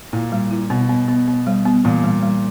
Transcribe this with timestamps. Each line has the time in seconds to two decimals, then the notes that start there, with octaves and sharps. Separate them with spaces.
0.13 A#2 E4
0.32 G3
0.51 E4
0.70 B2 B3
0.89 B3
1.08 B3
1.28 B3
1.47 G3
1.66 B3
1.85 A#2 E3
2.04 G3
2.23 G3